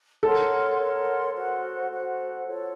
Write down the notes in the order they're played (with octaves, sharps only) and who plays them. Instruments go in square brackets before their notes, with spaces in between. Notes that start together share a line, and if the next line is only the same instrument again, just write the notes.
[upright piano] A4 [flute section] A#4 C#5 F#5 C6
[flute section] A#4 C#5 F#5 C6
F#4 C5 F#5
F#4 C5 F#5
F4 A4 C#5